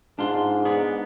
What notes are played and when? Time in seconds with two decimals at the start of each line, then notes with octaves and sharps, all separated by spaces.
0.19 G#2 D4 F4 C6
0.65 B3 D4 G#4